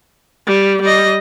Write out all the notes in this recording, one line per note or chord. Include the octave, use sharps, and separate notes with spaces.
G3
G3 D#5